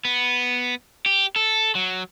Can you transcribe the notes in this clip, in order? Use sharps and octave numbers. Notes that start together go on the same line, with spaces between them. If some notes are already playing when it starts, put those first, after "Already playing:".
B3
G4
A4
F#3